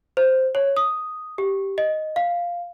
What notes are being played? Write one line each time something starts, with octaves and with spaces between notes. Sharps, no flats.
C5
C#5
D#6
G4
D#5
F5